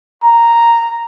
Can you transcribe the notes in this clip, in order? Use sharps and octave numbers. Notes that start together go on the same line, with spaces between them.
A#5